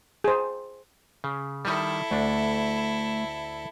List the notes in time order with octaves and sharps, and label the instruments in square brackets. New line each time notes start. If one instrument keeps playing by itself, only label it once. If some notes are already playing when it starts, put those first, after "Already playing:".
[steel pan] G#4 C5
[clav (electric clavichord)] C#3
[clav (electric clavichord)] D#3 G3 [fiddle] E4 A4
[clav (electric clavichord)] D2 D4 [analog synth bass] A3